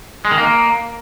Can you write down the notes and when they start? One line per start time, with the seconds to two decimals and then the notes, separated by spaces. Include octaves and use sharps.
0.25 G#3
0.31 D#3
0.38 A#3